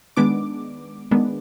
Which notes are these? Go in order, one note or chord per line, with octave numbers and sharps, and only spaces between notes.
D#3 G#3 B3 D4 D6
D#3 G#3 B3 D4